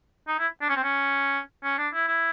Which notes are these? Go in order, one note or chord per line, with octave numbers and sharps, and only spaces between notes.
D#4
E4
D4
C#4
C4
C#4
C#4
D4
E4
E4